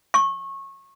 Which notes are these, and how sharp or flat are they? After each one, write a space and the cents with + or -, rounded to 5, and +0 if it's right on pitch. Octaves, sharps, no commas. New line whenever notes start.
C#6 -25